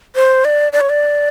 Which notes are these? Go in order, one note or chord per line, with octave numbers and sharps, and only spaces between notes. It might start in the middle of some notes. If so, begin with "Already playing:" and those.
C5
D5
D5
C#5
D5